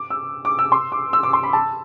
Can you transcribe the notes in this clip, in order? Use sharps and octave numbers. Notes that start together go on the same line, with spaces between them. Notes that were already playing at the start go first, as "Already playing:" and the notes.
Already playing: D6
E6
D6
E6
C6
D6
E6
D6
C6
B5
A5